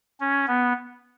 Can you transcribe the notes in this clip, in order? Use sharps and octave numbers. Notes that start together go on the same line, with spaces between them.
C#4
B3